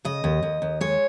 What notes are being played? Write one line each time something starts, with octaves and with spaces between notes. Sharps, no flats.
C#3 D#5
D#2
D#2
D#2
G#3 C#5